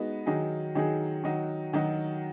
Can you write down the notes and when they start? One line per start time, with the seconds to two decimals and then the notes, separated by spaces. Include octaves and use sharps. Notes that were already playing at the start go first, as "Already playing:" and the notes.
Already playing: G#3 B3 D#4 F#4
0.26 D#3 F#3 D#4 G#4
0.75 D#3 F#3 D#4 G#4
1.23 D#3 F#3 D#4 F#4
1.73 D#3 F#3 D#4 F#4